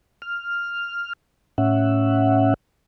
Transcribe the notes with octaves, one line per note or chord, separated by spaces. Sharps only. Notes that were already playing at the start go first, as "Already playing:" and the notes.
F6
A2 C#4 E5 F#5